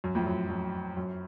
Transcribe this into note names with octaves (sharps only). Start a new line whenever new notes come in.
F#2
F2 A2
F#2
F#2
F#2